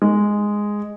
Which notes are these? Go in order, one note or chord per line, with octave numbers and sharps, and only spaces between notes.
G#3